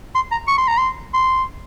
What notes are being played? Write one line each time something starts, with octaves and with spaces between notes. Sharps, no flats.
C6
A#5
C#6
C6
A#5
C6
C6